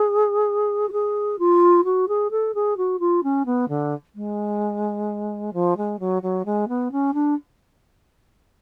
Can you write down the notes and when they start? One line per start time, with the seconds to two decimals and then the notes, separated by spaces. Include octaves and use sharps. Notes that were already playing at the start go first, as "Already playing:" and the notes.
Already playing: G#4
0.89 F#4
0.92 G#4
1.39 F4
1.84 F#4
2.08 G#4
2.31 A4
2.54 G#4
2.77 F#4
2.99 F4
3.23 C#4
3.46 B3
3.69 D3
4.15 G#3
5.53 F3
5.77 G#3
5.99 F#3
6.22 F#3
6.45 G#3
6.68 B3
6.92 C#4
7.14 D4